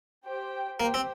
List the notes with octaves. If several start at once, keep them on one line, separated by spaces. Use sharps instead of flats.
G4 C5 G5
A#3 G4 C5 G5
C4